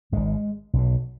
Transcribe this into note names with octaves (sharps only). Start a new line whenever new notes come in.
G#1 G#2 G#3
B1 B2